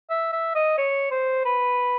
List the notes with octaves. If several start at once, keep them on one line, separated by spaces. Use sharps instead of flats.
E5
E5
D#5
C#5
C5
B4